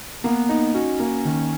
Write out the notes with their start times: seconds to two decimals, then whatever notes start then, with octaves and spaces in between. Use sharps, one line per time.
0.24 A#3 B3
0.49 D#4
0.74 C#4 F#4
1.00 A#3
1.25 D#3